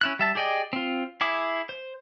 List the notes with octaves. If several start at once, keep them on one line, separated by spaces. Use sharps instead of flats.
C#4 E4 F#6
G3 E5 A5
G4 G#4 D5 D#5 G5
C4 F4
E4 G#4 E5 D6
C5